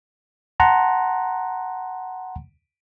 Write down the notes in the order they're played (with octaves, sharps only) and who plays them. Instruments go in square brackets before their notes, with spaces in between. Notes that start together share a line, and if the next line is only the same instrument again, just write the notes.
[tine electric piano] F#5 A5 A#5 C6